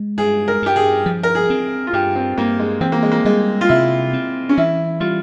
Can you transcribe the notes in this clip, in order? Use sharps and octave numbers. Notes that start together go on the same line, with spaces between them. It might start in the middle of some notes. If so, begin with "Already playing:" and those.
Already playing: G#3
G2 G#4
A#4
G2 G4
G#4
F3
A#4
G#4
C4
F4
G2 G4
C4
G2 A#3
G#3
E3 C4
A#3
G#3
A#3
G3 G#3
F4
C3 E4
C4
C#4
E3 E4
G3 F4